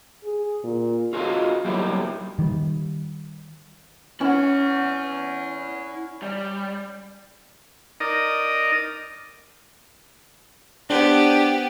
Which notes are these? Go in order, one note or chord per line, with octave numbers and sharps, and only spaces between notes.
G#4
A#2
F4 F#4 G#4 A#4 D#5 F5
F#3 G3 A#3 D#4 E4 G4
D#3 G3
C#4 E4 F#5
G3
D#4 A#4 D5 D#5
B3 D4 G4 G#4 C5 G5